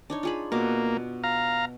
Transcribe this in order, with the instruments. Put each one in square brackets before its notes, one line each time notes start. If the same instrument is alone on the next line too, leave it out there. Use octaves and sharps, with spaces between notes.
[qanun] D4 D#4 C#5
F4 G#4 B5
[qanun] B2 D6 [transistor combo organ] A#3
[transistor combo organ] F5 A#5